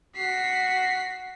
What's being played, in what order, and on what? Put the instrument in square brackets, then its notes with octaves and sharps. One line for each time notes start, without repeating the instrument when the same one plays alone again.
[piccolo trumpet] F#4 [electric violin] B6 C7